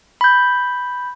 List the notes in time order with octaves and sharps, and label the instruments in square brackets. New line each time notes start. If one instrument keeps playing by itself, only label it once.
[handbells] B5 G6